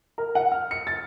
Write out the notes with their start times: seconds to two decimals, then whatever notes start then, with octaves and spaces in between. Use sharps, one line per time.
0.18 A#4
0.35 F#5
0.52 F6
0.71 C#7
0.87 A6